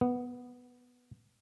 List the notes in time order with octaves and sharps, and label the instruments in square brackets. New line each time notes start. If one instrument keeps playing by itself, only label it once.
[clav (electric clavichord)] B3